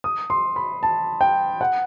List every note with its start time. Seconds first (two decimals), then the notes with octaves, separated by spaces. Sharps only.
0.04 D#6
0.30 C6
0.56 B5
0.83 A5
1.21 G5
1.61 F#5